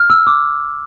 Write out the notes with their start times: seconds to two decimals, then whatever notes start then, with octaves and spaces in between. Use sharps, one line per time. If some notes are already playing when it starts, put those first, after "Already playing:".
Already playing: F6
0.10 E6
0.27 D6